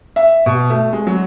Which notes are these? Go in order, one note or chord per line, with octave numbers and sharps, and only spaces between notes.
E5
B2
A3
G#3
F#3